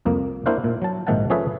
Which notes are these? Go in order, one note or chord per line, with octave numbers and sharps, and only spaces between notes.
C2 F2 A#3
A#3 D4 E4 C5 F5 F#5
A#2
F#3 A5
A#1 G#2 D#3 E5 F#5 A5
F3 C#4 G#4 A4 B4 E5